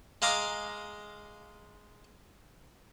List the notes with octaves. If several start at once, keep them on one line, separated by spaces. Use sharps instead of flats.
G#3 F5 A#5 D6